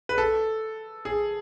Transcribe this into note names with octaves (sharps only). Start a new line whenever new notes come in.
B4
A4
G#4